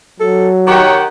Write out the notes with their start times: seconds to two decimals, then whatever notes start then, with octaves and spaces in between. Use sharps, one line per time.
0.20 F#3 A4
0.67 D#3 G4 C#5 F#5